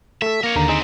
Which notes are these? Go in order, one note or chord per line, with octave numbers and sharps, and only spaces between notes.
A3 A4 E5
A#3 A#4 C#5
D#2 D3 D#3 A#5
B3 C4 D#4 G#4